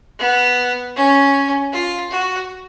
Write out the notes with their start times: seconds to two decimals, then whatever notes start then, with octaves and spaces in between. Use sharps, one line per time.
0.19 B3
0.96 C#4
1.72 F4
2.10 F#4